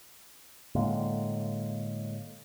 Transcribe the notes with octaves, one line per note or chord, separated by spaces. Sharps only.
A2 D3 G#3 A#3